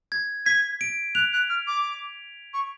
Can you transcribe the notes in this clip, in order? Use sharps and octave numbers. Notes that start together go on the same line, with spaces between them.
G#6
G#6 B6
D7
F#6 F7
F#6
F6
D6
C#6